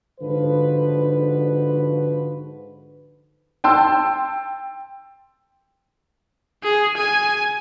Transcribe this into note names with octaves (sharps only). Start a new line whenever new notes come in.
G#2 D3 F3 F#4 B4
G5 A5 C6 E6
G#4
G#5